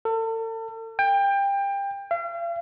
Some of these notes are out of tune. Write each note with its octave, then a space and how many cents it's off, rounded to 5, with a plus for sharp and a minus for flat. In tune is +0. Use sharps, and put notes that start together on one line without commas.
A4 +40
G5 +25
F5 -40